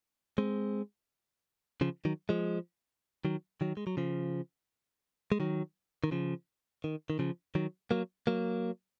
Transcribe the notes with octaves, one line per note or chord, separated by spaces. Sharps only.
G#3 C4
C#3 F3
D#3 F#3
F3 G#3
D#3 F#3
D#3 F#3
G#3
F#3
C#3 F3
G#3
D#3 F#3
D#3
C#3 F3
D#3
D#3
C#3 F3
D#3 F#3
F#3 A#3
F#3 A#3